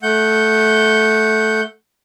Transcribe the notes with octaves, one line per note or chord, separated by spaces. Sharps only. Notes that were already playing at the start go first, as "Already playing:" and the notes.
A3 F#5 G6